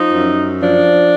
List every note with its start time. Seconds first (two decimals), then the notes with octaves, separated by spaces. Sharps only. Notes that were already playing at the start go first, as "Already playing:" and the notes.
Already playing: F3 D#4
0.14 F#2
0.60 F3 D4